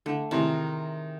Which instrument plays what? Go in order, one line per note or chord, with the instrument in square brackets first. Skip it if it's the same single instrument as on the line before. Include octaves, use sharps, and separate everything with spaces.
[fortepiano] D3 [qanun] A3
[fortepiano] A2 C3 E3 [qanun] D#3 G#4